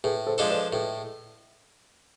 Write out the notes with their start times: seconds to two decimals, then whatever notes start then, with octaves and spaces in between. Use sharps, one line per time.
0.04 A2 G#4 B4
0.27 A4 C5
0.38 F3 G#3 D4 A4
0.50 B4 D5
0.72 A2 G#4 B4